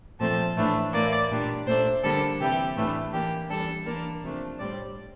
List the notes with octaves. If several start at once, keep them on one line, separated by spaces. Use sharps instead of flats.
A#2 F3 A3 C4 A5
A2 E3 A3 D4
A2 E3 A#3 D5
A#2 G3 D4
A#2 A3 D4 C5
D3 G3 A#3 D4 A4
C3 E3 G3 G4
A2 E3 A3 D4
E3 A#3 D4 G4
E3 G3 D4 A4
E3 A#3 D4 A#4
C3 F3 A3 D4
A2 G3 C4 D5